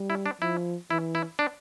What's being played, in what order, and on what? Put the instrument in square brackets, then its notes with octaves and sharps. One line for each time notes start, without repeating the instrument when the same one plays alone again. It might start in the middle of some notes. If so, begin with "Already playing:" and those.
Already playing: [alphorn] G3
[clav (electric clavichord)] E4
D4
[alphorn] F3 [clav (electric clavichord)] E4
[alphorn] E3 [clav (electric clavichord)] E4
[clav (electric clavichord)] E4
D4